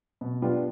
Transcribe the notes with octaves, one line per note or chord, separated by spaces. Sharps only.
B2
G3 B3 D4 F4